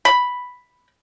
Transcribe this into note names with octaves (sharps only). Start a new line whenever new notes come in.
B5